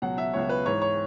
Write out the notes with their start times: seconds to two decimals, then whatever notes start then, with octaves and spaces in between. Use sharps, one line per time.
0.02 C#2 B2 F#3 F#5
0.18 E5
0.34 C#2 B2 F#3 C#5
0.49 B4
0.65 G#2 E3 C#5
0.82 C#5